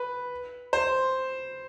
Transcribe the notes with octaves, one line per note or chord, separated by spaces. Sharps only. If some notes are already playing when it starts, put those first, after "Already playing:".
Already playing: B4
C5